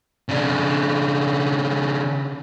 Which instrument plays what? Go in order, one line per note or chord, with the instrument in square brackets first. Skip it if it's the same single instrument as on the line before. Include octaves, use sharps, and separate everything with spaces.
[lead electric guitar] C#3 D4